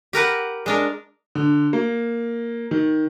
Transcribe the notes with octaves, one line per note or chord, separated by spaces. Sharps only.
G4 A#4 B4 F#5
G#3 D4 A#4
D3
A#3
D#3